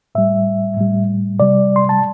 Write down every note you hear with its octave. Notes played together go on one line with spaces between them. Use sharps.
A2 G3 E5
A2 G3
C3 G3 D5
C6
A5